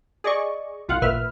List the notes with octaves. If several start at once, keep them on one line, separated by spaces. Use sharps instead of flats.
G#4 D5 D#5 C#6
C2 F4 F5 F#5
A1 A#2 B4 E5 F6